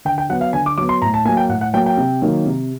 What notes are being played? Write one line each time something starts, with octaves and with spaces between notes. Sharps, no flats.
D3 G5
G5
F#3 B3 F#5
F5
D3 G#5
D6
F#3 B3 D6
C6
A2 A#5
A5
F#3 A#3 G#5
G5
A2 F#5
F#5
F#3 A#3 G5
G5
C3
D#3 F#3 A#3
C3